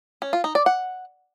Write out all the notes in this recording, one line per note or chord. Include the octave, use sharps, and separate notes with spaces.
C#4
F4
D#4
D5
F#5